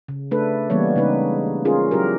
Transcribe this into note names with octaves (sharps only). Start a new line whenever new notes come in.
C#3
A3 D4 A4 B4
E3 G3 A#3 B3 C#5
C#3 G#3 C#4 D#4 B4
C#4 F4 G#4 A#4
F#3 C#4 E4 G4 A#4